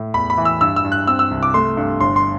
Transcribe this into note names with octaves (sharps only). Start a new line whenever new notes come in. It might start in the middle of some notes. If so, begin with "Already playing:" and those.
Already playing: A2
E2 B5
B5
E3
E6
G2 E6
E6
G2
F#6
C4 E6
E6
C2
D6
A3 C6
G2
G1 C6
C6